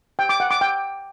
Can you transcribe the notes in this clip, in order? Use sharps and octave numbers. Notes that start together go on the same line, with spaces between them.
G5
D6
F#5
D6
G5